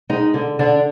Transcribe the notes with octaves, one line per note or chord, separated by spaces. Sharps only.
G#3 D#4
D3
D3 D4